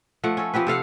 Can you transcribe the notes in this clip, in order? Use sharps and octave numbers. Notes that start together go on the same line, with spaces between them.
F3 A3 F#5
C#4 A4
F3 C4 G4 B4
C3 A4 F5 F#5